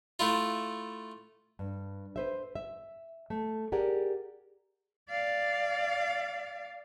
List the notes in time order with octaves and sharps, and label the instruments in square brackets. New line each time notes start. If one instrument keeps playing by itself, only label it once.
[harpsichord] A3 E4 F4
[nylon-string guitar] G2
B4 C5 E5
E5
A3
G4 G#4 A#4 D5 F#5
[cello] D5 F5